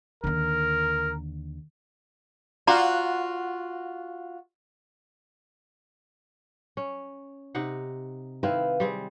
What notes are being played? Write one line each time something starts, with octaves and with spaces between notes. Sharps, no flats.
D#2 D3 A#4
F4 F#4 D5 A#5 D6
C#4
C3 D#4 F#5
D#3 C4 E4 B4 F5
G3 C4 G#4